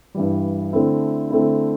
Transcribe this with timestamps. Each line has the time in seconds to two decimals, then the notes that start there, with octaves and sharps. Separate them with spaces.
0.15 G2 E3 G3
0.73 D3 A3 C4 E4
1.31 D3 A3 C4 E4